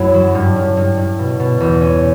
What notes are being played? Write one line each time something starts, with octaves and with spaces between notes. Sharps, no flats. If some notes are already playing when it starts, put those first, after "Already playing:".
Already playing: F#2 E4
F#3
G2
G2
G2
G2
B2
B2
E2
C#4